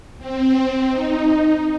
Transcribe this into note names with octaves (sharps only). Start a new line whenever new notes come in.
C4
D#4